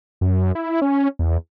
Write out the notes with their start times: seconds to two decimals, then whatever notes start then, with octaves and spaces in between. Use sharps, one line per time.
0.21 F#2
0.55 E4
0.82 C#4
1.19 E2